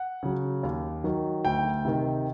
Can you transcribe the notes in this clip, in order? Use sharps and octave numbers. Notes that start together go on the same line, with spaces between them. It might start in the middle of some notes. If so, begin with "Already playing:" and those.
Already playing: F#5
C#3 F#3
D#2
D#3 F#3
D2 G5
C3 D#3